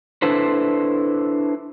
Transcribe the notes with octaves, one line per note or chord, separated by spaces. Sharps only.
D4 E4 A4 B4 C5